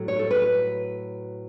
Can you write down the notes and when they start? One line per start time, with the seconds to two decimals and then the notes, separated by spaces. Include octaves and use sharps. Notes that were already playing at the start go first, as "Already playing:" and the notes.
Already playing: A2 F#3 A3
0.08 C#5
0.19 A4
0.31 B4